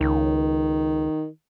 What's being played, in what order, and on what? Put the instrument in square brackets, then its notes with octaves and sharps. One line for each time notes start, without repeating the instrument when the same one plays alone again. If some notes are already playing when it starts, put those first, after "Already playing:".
[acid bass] C#2 [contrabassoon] D#3